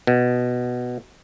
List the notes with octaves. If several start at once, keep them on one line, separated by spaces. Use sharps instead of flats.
B2